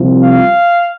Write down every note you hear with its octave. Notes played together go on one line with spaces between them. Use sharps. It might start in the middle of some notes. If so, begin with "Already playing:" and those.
Already playing: C2 C3 F3
F5